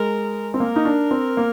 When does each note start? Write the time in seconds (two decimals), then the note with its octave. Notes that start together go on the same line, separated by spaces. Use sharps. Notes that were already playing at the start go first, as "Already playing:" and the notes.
Already playing: G#3 A#4
0.54 C4
0.60 A#3 A#4
0.76 D#4
0.85 D4
1.11 C4
1.37 A#3